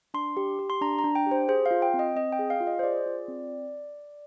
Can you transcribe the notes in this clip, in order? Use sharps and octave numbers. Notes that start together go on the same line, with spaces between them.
D4 C6
G4
G4
C6
D4 A#5
A#5
D4
G5
G4
C5
G#4 C5
F5
F4
G5
C4
D#5
C4 D#5
G5
G#4
F5
F4
D#5
C5
G#4 D5
F4
C4